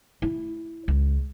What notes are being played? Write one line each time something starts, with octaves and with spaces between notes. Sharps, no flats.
E4
C#2